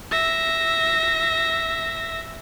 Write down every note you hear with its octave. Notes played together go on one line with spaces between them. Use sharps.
E5 A#6